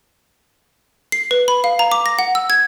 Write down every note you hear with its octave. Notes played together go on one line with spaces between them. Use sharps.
C7
B4
B5
F5
A#5
D6
A#6
F#5
E6
G#6